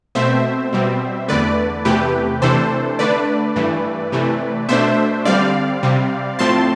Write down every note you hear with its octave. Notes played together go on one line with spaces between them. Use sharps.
B2 A3 C4 C5 E5
B2 G3 C4
E2 D3 A3 B4 D5
E2 C3 E3 A3 G4 B4
C3 E3 A3 D4 A4 C5
D3 A3 D4 B4 D5
G2 E3 A3
C3 E3 A3
B2 A3 D4 C5 E5
D3 G3 C4 D5 F5
C3 G3 C4
A2 F3 A3 C4 A5 C6